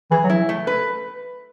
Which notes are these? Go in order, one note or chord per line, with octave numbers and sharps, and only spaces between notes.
E3 G#4
F#3
E4
A3
B4